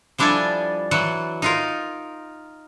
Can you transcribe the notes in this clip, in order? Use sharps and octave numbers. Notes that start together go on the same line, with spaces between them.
F3 G3 D4 E4 A4 G#5
E3 F#3 F#5
D#4 F4 A#4